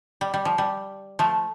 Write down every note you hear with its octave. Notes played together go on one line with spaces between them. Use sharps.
G3
G3
F3
G3
F3 A3